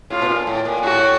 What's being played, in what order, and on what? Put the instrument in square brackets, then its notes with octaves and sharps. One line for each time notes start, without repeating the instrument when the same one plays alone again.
[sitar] A2 [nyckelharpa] F4
[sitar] B2
A#2
A2
A#2
[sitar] A2 [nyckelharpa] F#4